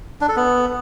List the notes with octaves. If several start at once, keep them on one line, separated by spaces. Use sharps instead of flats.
D4
A4
B3